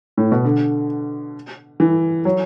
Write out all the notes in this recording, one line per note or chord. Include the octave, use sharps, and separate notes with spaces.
A2
B2
D3
E3
F#3